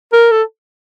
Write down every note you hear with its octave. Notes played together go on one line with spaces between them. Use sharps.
A#4
A4